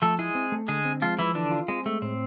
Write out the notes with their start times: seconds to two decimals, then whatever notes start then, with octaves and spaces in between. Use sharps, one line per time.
0.02 F3 A3 A4
0.19 G#3 E4 G#4
0.35 C4
0.52 A3
0.68 D3 G#3 G#4
0.85 C4
1.02 F3 G#3 F4
1.19 E3 F3 E4
1.35 D3 E3 D4
1.51 F4
1.68 G#3 C4
1.86 G#3 A3
2.02 A2 C4